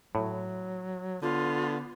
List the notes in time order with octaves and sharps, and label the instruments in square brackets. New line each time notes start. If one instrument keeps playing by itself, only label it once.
[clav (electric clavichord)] A2 [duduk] F#3
[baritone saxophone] D3 [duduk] B3 [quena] F4